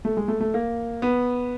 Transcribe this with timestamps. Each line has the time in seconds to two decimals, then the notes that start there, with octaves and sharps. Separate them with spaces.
0.05 A3
0.17 G#3
0.28 A3
0.41 A3
0.54 A#3
1.02 B3